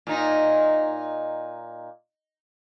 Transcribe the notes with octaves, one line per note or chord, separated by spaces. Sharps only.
A#2 D#4